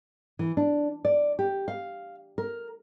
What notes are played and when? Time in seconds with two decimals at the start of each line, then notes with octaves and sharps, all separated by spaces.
0.39 E3
0.57 D4
1.05 D5
1.39 G4
1.68 F5
2.38 A#4